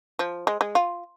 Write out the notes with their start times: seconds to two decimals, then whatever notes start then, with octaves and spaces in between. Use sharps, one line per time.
0.19 F3
0.47 G#3
0.61 G#3
0.75 F4